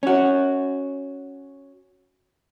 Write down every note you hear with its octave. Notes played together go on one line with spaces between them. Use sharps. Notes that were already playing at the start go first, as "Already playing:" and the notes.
C#4 F#4